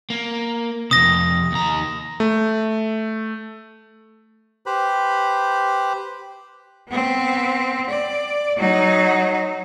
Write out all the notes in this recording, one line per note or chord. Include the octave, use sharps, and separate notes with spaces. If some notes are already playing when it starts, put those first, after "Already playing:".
A#3
F2 C3 D#6 A#6
D#2 A#5
A3
G4 B4 C5 B5
B3 C4
D5
F#3 D#4